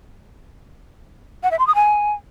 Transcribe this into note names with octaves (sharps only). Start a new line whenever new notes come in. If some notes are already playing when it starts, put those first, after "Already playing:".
F#5
E5
C6
D#6
G#5